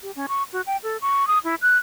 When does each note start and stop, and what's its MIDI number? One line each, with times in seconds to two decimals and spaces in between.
0.03 0.11 67
0.16 0.26 61
0.29 0.43 85
0.53 0.61 66
0.66 0.77 79
0.83 0.97 69
1.02 1.27 85
1.27 1.39 87
1.44 1.55 64
1.62 1.77 90